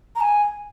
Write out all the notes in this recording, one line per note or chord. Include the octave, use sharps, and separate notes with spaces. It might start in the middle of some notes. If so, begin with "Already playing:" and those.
A#5
G#5